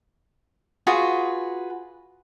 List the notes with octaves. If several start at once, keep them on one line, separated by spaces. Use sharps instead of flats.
F4 F#4 G#4 B4